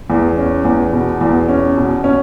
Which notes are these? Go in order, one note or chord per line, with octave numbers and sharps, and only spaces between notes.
E2
C#4
E2
B2
E2
C#4
B2
C#4